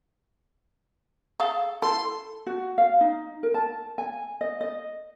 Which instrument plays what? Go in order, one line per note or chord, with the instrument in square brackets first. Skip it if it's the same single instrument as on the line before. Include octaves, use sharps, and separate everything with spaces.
[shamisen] G#4 A4 F5
[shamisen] E4 [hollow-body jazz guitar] A4 [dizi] C6
[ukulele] F#4
F5
D#4
A#4
A5
G#5
D#5
D#5